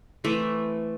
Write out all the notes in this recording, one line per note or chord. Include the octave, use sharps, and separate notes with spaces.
E3 A3 C4